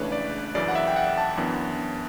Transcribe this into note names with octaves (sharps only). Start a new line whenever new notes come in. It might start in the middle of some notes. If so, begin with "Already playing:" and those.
Already playing: C#2 C#3 E3 A3 D4 B4 C#5
D5
F#2 C#3 E3 D5
F#5
E5
G5
F#5
A5
F#2 E3 B3 D4